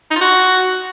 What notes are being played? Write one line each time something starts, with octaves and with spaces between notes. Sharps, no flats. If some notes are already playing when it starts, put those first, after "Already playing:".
D#4
F4
F#4